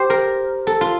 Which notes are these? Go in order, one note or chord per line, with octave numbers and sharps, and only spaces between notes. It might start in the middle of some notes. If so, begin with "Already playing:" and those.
Already playing: G4 C5
A#4
A4
F4